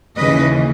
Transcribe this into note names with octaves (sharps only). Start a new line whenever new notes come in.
D#2 C#3 E3 B4 D#5